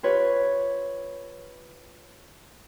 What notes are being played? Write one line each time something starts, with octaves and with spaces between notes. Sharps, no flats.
F4 G4 B4 C#5